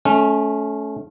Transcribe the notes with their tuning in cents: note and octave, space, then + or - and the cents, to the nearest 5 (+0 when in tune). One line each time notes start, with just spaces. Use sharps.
A3 -25 C#4 +0